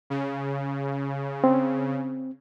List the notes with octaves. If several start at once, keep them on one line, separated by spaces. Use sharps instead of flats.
C#3
C4